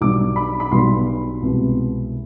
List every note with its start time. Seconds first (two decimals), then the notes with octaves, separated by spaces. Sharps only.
0.01 B1 B2 G3 D4 D6
0.36 B5
0.60 B5
0.71 B1 B2 G3 D4 C6
1.42 C2 B2 G#3 B3